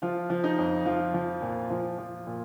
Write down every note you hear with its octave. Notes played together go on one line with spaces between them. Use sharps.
F3 F4
F3
D#4
F2
F3 F4
F3
A#2
F3
F3
A#2